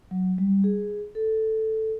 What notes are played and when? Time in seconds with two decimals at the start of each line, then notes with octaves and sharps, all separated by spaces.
0.11 F#3
0.38 G3
0.64 G#4
1.15 A4